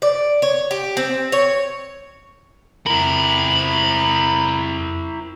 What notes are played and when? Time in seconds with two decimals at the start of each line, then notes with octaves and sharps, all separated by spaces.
0.02 D5
0.42 C#5
0.71 G4
0.97 C4
1.32 C#5
2.87 F2 E4 A#4 B5